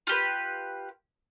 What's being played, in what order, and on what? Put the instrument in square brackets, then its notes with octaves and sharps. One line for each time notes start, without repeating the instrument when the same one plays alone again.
[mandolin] F4 G4 B4